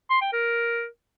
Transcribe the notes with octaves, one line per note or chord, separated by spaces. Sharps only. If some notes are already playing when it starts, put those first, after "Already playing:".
C6
G5
A#4